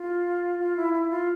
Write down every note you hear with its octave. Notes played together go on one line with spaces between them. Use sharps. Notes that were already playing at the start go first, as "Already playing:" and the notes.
Already playing: F4
F4
E4
E4
F4